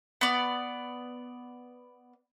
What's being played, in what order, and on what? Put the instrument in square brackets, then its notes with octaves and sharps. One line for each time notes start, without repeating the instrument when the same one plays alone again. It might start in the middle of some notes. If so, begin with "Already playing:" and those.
[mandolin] B3 D5